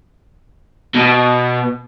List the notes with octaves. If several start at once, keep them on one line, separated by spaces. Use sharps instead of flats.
B2